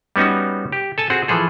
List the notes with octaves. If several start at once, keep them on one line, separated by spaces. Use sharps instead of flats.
G3 B3 C#4 D#4 F#4
G4
A4 G#5 A5
C4 F#4 G#4
E3 F3 G#4 A4